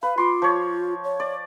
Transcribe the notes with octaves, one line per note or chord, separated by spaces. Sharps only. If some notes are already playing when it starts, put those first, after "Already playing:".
B4 F5
F4 C6 D6
F3 C#5
C#5
D5